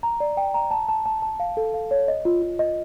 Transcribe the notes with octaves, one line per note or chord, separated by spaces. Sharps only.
A#5
D5
G5
A#5
A5
A5
A5
A5
F5
A4
F5
C#5
D#5
F4
F4
D#5